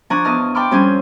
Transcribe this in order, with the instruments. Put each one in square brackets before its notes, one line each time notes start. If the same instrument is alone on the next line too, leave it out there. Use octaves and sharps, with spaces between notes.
[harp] F3 D4 G#5 A#5 C#6 F#6
E2 D#5 A5 F6
G5 A5 B5 C6 D6 F6
F2 G3 C#4 C5 G#5